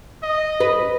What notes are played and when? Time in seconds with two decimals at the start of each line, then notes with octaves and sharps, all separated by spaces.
0.23 D#5
0.60 B4